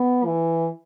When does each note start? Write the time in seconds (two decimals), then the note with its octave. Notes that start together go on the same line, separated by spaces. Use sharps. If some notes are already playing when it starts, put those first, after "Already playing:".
Already playing: B3
0.25 E3